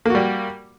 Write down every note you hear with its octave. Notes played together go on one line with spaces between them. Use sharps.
G3 A#3 F#4